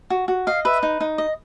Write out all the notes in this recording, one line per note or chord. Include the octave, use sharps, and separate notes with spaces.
F#4
F#4
D#5 F5
B4 E5
D#4
D#4
D#5